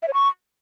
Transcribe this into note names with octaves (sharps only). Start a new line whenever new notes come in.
E5
C#5
C#6